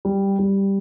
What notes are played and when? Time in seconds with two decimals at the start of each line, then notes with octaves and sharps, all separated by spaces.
0.05 G3
0.39 G3